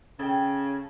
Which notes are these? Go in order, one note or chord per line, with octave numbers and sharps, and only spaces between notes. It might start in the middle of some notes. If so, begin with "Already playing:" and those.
C#3 A4 G5